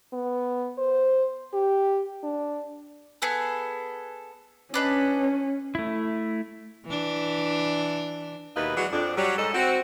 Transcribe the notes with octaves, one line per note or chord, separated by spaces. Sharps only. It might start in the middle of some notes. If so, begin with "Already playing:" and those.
B3
C5
G4
D4
B3 G#4 A4
C#4 D4 B4 D#5
A3 E4
E3 D4
D#2 B2 D#4 E4 B4 F5
E3 F#3 G#3 D4 F#4
F2 D4
F#3 G3
G#2 A4 D#5
C4 F#4